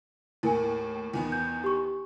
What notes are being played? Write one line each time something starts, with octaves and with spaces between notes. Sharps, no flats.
D#2 A2 E4 A#4 G#5
E2 D#3 B3
G6
G4 C#6